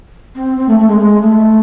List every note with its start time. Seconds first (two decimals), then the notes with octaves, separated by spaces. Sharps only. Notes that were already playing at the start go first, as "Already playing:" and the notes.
0.35 C4
0.57 C4
0.68 A3
0.79 A3
0.88 G#3
0.99 G#3
1.21 A3